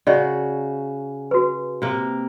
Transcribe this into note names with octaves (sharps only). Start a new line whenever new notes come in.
C#3 F#4 D5 D#5
F#4 B4
C3 A#3